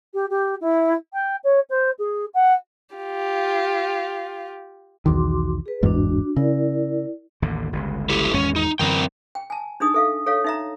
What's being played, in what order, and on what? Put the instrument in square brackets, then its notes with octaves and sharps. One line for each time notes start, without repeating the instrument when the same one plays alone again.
[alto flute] G4
G4
E4
G5
C#5
C5
G#4
F#5
[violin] F4 G4
[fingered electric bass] B1 E2 D#3 [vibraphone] F#4 C6 D6
[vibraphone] G#4 B4
[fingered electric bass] G1 E2 G#2 [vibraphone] D4 F#4
[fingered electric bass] C#3 [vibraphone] E4 A#4 D5
[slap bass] A1 D#2 D3
G1 C#2
[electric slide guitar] E4 G4 A4
[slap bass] G#1 E2 G#3 [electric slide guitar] C#4
[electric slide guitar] D#4
[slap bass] F#2 D3 E3 [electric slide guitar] C4 A#4 G5
[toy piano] G5
G#5 A5
D4 D#4 G#4 D#6
A4 E5 F5
A4 C#5 F5
D#4 E5 A#5